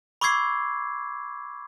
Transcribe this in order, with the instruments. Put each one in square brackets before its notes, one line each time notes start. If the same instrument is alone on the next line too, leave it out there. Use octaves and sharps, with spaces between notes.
[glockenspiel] B5 C#6 D6 E6 G#6 C7